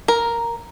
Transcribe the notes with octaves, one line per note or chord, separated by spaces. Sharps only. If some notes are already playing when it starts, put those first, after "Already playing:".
A#4